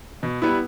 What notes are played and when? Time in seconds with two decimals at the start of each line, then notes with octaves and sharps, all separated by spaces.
0.23 B2
0.42 G3 B3 E4 B4